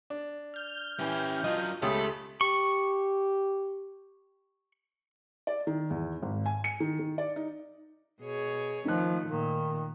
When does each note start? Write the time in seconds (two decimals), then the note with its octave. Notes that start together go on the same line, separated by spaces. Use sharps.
0.10 D4
0.54 F6 G6
1.00 E3 C#4 G4
1.44 F#3 D4 F4 D#5
1.82 C#2 A3 G4 A4 B5 D#6
2.41 G4 C#6
5.47 D5
5.67 D#3
5.90 E2
6.22 G#1
6.46 G#5
6.64 C#7
6.80 D#3
6.99 D#3
7.18 D5
7.36 D#4
8.21 B2 G#4 C#5
8.85 D#3 F3 A3 D#4 F#6
9.26 A#2 D#3